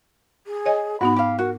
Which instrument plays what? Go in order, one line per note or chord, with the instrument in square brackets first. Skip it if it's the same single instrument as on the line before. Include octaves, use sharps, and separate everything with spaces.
[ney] G#4
[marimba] C#5 D#5 G#5
[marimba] G#2 B3 D#4 [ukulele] F#4 [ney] B5
[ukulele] G4 F5
[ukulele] F#4 [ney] A#4